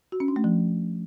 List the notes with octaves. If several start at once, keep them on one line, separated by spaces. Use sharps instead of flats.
F#4
C#4
D4
A3
F3